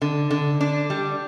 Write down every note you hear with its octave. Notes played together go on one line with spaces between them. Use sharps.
D3
D3
D4
G3